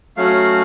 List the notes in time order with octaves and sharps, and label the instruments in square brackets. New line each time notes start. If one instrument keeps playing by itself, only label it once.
[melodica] F#3 A3 C#4 F#4 F5